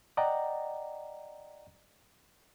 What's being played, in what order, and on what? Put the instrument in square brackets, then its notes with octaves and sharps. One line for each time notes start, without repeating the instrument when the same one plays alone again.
[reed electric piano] D5 D#5 F#5 G5 A#5